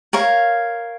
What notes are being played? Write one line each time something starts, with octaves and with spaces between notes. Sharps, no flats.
A#4 C#5 F5